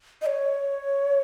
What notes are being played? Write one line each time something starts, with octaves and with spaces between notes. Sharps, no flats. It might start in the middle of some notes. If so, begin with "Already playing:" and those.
D#5
C#5